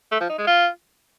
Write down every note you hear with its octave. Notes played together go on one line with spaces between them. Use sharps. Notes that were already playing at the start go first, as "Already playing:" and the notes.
A3
F3
D#4
G#3
F4